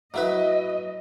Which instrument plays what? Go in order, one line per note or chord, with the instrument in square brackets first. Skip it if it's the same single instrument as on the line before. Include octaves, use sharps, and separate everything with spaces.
[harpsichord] F#3 E4 B4 [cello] D#5